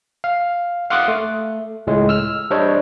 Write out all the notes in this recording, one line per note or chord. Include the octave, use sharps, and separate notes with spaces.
F5
F5 F#5 C6 D6 D#6 F#6
A3
C#2 A2 G#3
E6 F6
G3 D4 C5 C#5 D#5